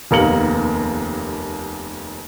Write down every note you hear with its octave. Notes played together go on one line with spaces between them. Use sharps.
F1 D#2 A#3 B3 C#7 F#7